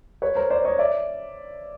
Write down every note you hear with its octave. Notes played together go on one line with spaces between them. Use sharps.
B4 C#5
A#4 C5
C5 D5
C#5 D#5
D5 E5